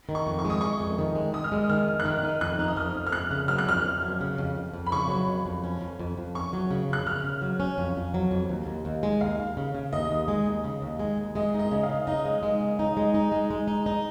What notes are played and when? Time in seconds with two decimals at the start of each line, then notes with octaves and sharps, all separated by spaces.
0.09 D#3
0.15 C#6
0.27 F2
0.39 C#6
0.45 G#3
0.50 D#6
0.61 G#3 C#6
0.81 F2
0.98 D#3
1.15 G#3
1.34 G#3 D#6
1.44 F6
1.52 G#3 D#6
1.70 D#3 F6
1.88 F2
2.00 F#6
2.05 D#3 F6
2.23 D#4
2.41 F2 F#6
2.59 D#4
2.68 D#6
2.76 F2 F6
2.95 F2
3.07 F6
3.12 F2 F#6
3.31 C#3
3.48 F#3 F6
3.58 F#6
3.66 F2 F6
3.85 F2
4.02 F#3
4.21 C#3
4.38 F2
4.55 F2
4.73 F2
4.86 B5
4.92 C#3 C#6
5.09 F#3
5.28 F2
5.46 F2
5.64 C#4
5.81 F2
6.00 F2
6.17 F2
6.35 C#4 C#6
6.53 F#3
6.71 C#3
6.89 F2 F#6
7.06 C#3 F6
7.24 C#3
7.42 F#3
7.60 C#4
7.78 F2
7.96 F2
8.14 F#3
8.31 F2
8.49 D#2
8.67 D#2
8.85 D#2
9.03 G#3
9.21 D#2 F5
9.39 D#2
9.57 C#3
9.75 C#3
9.93 D#2 D#5
10.11 D#2
10.28 G#3
10.46 D#2
10.64 C#3
10.82 D#2
10.99 G#3
11.17 D#2
11.35 G#3 D#5
11.54 D#4
11.59 D#5
11.72 C#3
11.83 F5
11.89 C#3
12.07 D#4 D#5
12.26 G#3
12.43 G#3
12.61 C#3
12.79 D#4
12.97 G#3
13.14 D#4
13.32 G#3
13.50 G#3
13.68 D#4
13.86 D#4